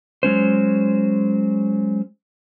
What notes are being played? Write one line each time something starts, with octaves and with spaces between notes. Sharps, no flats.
F#3 G#3 C#4 C5